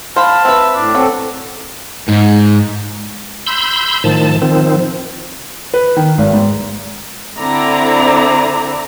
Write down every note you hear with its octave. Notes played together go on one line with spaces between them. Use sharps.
C5 F5 A5 B5
C4 B4 E5
A2 D4
F#3 C4 A4
G#2
B5 C6 E6 G6
A2 D#3 F3 A5
D#3 F3 C4
B4
D#3
G#1
G#2
D3 C4 E4 D5 A#5